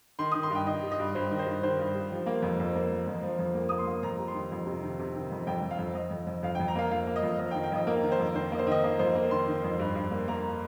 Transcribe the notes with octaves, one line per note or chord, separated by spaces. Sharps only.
D#3 C6
D#6
D#3
C6
G2 G5
D#3 D#5
G3
D#5
G2
G2 C5
D#3
C5
G2
D#3 C5
G2
G3
F3
A#3
F2
F2
A#3
F3
F2
F3
F2
A#3
A#3 D#6
C6
A#3
F2 A#5
G3
C6
D#3
F2
C3
D#3
C3
D#3
F2
F2 G5
F2
F5
F2
F2 D#5
F2
F2
F2 F5
G5
F2
A#5
A#3 F5
F2 F5
A#3
D#5
F2
F2 D#5
G5
D#3
G5
F2 D#5
A#3 A#4
D#3
C5
F2
D#3 C5
A#3 D#5
C5
D#3 D#5
A#3 D#5
F2 C5
A#3
D#3 C6
D#3
F2
G2
G2
A#3
A#3 A#5